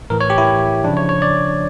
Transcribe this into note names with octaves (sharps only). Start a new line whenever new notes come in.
A2 E3 A#4
C#5
G4
E4
C#3 F3 D4
C#5
C#5
D5